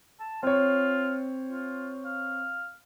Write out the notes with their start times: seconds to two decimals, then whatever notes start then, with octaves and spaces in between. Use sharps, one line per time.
0.20 A5
0.43 C4 F4 C#5
1.51 F4
2.05 F5